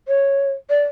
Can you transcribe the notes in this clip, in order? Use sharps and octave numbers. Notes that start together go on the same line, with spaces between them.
C#5
D5